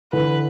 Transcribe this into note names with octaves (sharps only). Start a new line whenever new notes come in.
D3 E3 B4